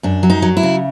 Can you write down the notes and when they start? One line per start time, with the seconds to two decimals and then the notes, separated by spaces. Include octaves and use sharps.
0.03 F#2 D4
0.23 F#3
0.30 D#4
0.42 F#3
0.57 E4
0.63 C#3